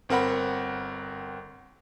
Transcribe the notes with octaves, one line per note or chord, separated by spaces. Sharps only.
G1 C4 A#4 F#5 B5